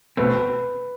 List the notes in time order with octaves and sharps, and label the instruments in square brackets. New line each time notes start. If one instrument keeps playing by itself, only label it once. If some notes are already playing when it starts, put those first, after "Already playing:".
[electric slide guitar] B2 A3 C4 [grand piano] B4